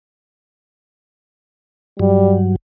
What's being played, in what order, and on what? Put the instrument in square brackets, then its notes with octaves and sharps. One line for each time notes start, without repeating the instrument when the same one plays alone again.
[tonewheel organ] G2 F#3 [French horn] G3